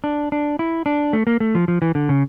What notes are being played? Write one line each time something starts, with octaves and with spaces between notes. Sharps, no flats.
D4
D4
E4
D4
A3
A#3
A3
F3
F3
E3
D3
C#3